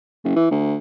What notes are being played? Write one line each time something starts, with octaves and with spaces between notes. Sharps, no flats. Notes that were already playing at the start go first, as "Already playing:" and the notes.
F#1
E3
D2